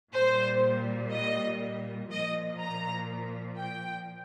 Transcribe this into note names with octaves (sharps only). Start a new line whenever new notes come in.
A#2 G3 C5
D#5
A#2 F3 D#5
A#5
G5